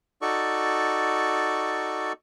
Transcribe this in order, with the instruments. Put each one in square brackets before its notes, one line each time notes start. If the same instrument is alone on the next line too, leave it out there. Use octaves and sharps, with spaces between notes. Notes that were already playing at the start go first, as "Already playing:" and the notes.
[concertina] D#4 F#4 A4 D5 C#6